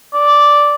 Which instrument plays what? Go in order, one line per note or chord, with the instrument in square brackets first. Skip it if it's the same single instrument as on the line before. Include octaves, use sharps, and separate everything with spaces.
[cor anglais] D5